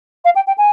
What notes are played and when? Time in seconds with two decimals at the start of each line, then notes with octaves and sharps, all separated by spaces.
0.24 F5
0.35 G5
0.47 G5
0.57 G#5